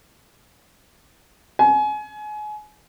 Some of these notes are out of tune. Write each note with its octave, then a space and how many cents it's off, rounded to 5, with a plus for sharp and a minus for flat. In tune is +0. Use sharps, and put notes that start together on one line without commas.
G#5 +30